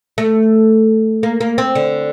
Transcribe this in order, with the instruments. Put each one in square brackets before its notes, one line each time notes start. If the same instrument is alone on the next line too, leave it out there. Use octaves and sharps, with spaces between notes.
[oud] A3
A#3
A#3
C4
D3